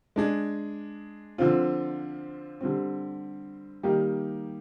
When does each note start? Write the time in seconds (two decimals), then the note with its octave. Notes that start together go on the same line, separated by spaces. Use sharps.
0.16 G#3 D4 G#4
1.38 D3 F3 C4 F4
2.61 D3 G3 C4
3.83 D#3 G3 A#3 D#4 G4